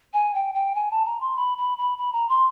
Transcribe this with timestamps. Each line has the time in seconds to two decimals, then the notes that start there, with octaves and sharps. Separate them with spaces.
0.14 G#5
0.35 G5
0.55 G5
0.75 G#5
0.91 A5
1.06 A#5
1.21 C6
1.36 B5
1.58 B5
1.78 B5
1.98 B5
2.13 A#5
2.29 C6